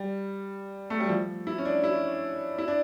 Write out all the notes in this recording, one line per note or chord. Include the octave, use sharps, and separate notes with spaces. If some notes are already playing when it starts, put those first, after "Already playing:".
Already playing: G3
A3
G3
F3
E4
C#4
D4
E4
E4
D4